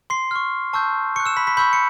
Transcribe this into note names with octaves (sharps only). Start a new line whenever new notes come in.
C6 C7
C#6 F6
A5 C#6 E6 G6
C#6 F#6 C#7
E6 E7
B5 B6
B5 B6
B5 C#6 E6 G6 B6
C#7